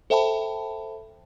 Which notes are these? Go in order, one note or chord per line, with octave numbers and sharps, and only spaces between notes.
A4 C5 E5 G5 A5 B5